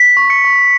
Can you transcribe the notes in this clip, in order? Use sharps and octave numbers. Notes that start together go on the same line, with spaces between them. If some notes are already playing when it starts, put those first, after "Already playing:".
Already playing: B6
C#6
C#7
C#6